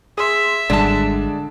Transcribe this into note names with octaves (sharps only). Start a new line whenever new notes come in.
G#4 E5 C6
G#1 D3 G3 G#3 D5 A5